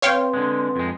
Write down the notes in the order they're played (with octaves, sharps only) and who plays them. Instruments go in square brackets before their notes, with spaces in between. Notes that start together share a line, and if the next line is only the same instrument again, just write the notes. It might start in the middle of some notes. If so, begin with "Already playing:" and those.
[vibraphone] C4 B4 C6 [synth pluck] C#5 F5 G5
[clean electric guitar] D3 G#3
F2 G#3